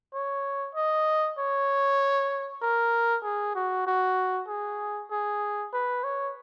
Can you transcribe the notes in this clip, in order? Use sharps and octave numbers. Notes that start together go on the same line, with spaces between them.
C#5
D#5
C#5
A#4
G#4
F#4
F#4
G#4
G#4
B4
C#5